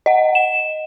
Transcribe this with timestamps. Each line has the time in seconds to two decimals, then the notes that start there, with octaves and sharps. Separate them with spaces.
0.06 D#5 F#5
0.35 E7